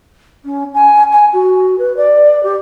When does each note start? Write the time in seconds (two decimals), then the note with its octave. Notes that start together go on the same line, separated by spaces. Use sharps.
0.45 C#4
0.74 G#5
1.12 G#5
1.33 F#4
1.78 B4
1.97 D5
2.43 G4